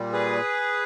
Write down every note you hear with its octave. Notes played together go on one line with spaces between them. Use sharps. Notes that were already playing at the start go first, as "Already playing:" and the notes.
Already playing: A#2 G3
G#4 B4